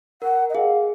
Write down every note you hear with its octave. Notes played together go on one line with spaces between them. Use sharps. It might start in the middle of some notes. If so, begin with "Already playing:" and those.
A#4 F#5
D#5
G#4 F5